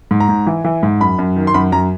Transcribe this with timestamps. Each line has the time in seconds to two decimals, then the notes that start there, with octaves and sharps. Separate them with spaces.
0.11 G#2
0.20 A#5
0.29 G#2
0.47 E3
0.65 E3
0.83 G#2
1.01 F#2 B5
1.19 F#2
1.36 D#3
1.47 C6
1.54 F#2 B5
1.72 F#2 A#5